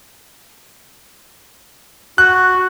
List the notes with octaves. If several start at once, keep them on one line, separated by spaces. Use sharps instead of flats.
F#4 F#6